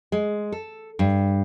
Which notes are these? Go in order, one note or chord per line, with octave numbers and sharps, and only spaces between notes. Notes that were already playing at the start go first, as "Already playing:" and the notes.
G#3
A4
G2